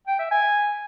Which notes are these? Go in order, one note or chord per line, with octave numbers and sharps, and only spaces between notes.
G5
E5
G#5